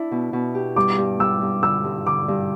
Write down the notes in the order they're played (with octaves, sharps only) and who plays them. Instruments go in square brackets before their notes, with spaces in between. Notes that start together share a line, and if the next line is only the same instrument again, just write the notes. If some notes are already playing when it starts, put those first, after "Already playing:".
Already playing: [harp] D4 E4
B2
B2
G4
[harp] G3 [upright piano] D6
[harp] G2
[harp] G3 [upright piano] E6
[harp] G2
[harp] D3 [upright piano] E6
[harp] G2
[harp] D3 [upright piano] D6
[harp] G2